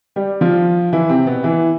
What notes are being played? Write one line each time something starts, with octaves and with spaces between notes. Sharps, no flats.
G3 G4
F3 F4
E3 E4
C3 C4
B2 B3
E3 E4